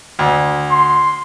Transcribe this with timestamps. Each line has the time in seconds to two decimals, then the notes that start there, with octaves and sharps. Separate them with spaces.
0.19 D2
0.71 C6